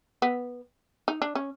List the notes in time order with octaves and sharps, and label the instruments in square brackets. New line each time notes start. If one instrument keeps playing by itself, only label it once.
[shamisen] B3
D#4
D4
C#4